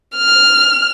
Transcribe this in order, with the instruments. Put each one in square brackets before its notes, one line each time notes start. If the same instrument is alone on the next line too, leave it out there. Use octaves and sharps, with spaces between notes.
[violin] F6